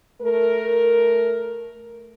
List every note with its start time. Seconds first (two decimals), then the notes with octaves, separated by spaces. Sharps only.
0.22 A3 A#4